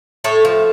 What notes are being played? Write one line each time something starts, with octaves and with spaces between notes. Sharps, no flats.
A2 A4 C#5
F3